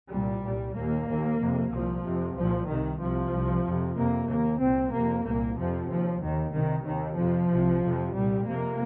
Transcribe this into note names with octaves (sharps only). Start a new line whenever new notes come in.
C2 A#2 G3
C2 A#2
D#2 A#3
D#2
F2 C3
C2 A#2 F3
F2 C3
C2 F3
A#2
C2 C3 D#3
C2 C3 F3
C2 C3
F2 C3
F2 C3 A#3
D#2 A#3
C2 A#2 C4
F2 C3 A#3
C2 A#2 A#3
F2 C3 F3
D#2 F3
D#2 D#3
C2 C3 D#3
D#2 D#3
F2 C3 F3
C2 C3
F2 C3
C2 A#2 G3
F2 C3 A#3